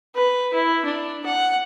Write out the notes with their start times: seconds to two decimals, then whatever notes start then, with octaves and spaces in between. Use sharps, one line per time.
0.15 B4
0.53 E4
0.85 D4
1.26 F#5